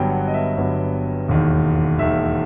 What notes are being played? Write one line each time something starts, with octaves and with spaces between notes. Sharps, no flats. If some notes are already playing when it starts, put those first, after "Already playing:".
Already playing: G1 G2 F#3 B3 G5
F#5
D#5
E5
G1 G2 F#3 B3
E1 D#2 D#3
E1 D#2 D#3 E5